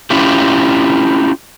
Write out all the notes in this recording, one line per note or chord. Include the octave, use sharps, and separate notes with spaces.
C#4 E4 F4 G4